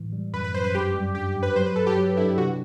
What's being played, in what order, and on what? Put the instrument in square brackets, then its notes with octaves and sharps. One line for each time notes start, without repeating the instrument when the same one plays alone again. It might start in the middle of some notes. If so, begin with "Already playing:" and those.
Already playing: [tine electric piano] A2 E3
G3
[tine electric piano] F#2 [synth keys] B4
[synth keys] B4
[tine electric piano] F#2 [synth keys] C5
[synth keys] B4
[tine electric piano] G2 [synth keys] G4
[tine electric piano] G3
[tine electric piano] G2 [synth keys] G4
[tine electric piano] G2
[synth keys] B4
[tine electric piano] F#3 [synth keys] C5
[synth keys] B4
[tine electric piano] G2 [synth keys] A4
[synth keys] G4
[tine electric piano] F#3
[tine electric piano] D4 [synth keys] E4
[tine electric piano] C3 [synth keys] F#4